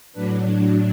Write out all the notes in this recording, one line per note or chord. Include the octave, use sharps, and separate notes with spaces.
A2 F#3 D4 B4